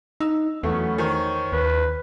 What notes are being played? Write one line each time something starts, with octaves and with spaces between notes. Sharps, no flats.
D#4 E6
E2 F#3 A3 B3 C#4
D#3 C5 C#5
D#2 B4